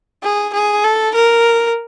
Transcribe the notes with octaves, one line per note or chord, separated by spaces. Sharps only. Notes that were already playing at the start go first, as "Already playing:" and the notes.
G#4
G#4
A4
A#4